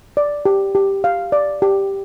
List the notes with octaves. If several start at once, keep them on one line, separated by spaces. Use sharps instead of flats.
D5
G4
G4
F5
D5
G4